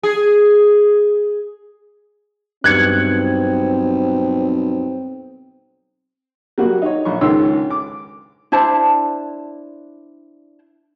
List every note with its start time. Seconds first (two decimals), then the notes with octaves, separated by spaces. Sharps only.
0.03 G#4
2.64 B1 G2 C4 F#6 G#6 C#7
6.58 F#3 G3 A#3 F#4
6.82 D#4 C#5
7.05 A#1 C#6
7.21 C#2 G#2 D#3 C#5 E6
7.70 D6
8.52 D4 E4 C5 A5